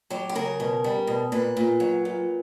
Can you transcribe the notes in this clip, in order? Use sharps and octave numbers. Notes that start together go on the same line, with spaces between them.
F#3 G4
G4
C#3 A#4
B2
G3
B2
A#2 B4
A#2
F#3
A#2